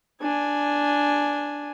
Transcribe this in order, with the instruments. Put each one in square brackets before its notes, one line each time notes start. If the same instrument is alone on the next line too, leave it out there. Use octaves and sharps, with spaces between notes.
[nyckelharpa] D4 G#5